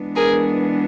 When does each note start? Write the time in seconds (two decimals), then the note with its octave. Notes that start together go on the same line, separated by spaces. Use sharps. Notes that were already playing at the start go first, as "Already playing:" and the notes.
Already playing: E3 G#3 B3 D4
0.16 G#4 A#4